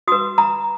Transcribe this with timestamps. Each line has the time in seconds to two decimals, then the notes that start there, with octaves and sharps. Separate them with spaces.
0.08 F#4 B4 D#6
0.38 A#5